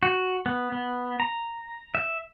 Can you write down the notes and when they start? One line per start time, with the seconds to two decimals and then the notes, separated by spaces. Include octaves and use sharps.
0.03 F#4
0.46 B3
0.72 B3
1.20 A#5
1.95 E5